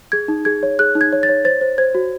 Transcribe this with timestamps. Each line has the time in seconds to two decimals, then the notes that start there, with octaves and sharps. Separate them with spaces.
0.12 G#4 G#6
0.28 D#4
0.45 G#4 G#6
0.63 C#5
0.79 G#4 F#6
0.95 D#4
1.01 G#6
1.13 C#5
1.23 A6
1.29 C#5
1.45 C5 A6
1.61 C5
1.78 C5 G#6
1.95 F#4